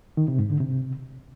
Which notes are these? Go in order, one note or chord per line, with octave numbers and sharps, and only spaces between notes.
D#3
C3
G#2
D3
C3